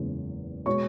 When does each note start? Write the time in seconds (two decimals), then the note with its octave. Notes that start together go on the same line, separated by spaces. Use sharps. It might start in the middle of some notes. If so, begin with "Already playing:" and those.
Already playing: F#1 E2 C#3 G#3
0.66 B2 G#3 C#5 C#6